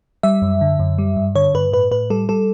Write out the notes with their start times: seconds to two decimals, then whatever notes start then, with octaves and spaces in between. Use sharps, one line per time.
0.23 G3 E5
0.42 F#2
0.61 D3
0.79 F#2
0.98 G3
1.17 G2
1.35 D3 C#5
1.54 G2 B4
1.72 A2 B4
1.91 A2 B4
2.10 G3 A4
2.29 G3 A4